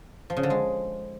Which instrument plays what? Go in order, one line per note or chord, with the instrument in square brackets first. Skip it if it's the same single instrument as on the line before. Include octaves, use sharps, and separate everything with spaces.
[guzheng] F3
C#3
D3
G#3